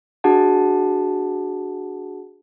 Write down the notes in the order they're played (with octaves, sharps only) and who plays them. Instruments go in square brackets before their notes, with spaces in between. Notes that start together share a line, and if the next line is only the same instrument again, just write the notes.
[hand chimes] D4 F#4 G#4 F#5 A5